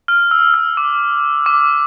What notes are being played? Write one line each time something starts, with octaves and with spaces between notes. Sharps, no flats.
F6
E6
F6
D6
D6